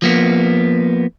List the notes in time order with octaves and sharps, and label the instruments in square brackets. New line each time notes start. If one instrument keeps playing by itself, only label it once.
[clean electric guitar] F3 A#3 B3